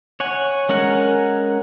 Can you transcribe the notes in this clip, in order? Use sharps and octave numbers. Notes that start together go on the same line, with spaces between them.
C#5 F#5 G#5
G#3 C#4 A#4 F#5